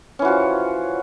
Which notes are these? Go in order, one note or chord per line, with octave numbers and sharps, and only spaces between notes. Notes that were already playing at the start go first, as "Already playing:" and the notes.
E3 F3 C#4 F#4